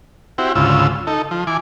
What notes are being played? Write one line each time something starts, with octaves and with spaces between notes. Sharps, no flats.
C4 E4 F#4 G4
D2 G#2 C#3 F4 E6
D#4 A4
F3
E3 G#5 D6